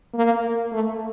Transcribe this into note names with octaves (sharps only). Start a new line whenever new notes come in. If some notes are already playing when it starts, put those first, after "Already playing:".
A#3
A3